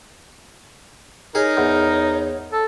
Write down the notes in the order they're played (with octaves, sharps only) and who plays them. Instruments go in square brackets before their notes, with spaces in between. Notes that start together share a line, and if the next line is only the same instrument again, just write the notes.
[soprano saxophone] D#4 [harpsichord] G#4 [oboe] A#4 [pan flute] C#5
[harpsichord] E2
[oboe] A4